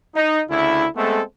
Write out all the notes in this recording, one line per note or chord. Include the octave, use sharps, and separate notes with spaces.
D#4
D2 C#3 E4
G#3 A3 B3 C4 A4